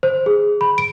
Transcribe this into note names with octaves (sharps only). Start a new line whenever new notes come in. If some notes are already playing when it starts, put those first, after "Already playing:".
C5
G#4
B5
D7